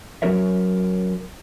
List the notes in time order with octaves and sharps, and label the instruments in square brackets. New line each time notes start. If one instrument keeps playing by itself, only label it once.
[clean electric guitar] F#3 C#4 F#4 A#4 C#5 E5